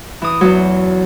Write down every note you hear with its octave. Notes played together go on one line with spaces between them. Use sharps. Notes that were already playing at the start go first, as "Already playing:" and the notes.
E3 D#6
E2 F#3